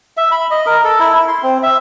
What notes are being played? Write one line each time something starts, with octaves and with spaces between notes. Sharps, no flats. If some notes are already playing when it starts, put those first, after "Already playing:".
E5
B5
D#5
A#4
A4
E4
E4
C6
C4
E5